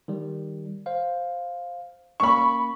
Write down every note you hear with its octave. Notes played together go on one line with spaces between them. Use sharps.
D#3 G3
C5 F5
A#3 C#4 B5 C#6